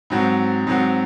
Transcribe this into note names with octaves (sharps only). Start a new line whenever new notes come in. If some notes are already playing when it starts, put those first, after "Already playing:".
G#2 F#3 C4 F#4
G#2 F#3 C4 F#4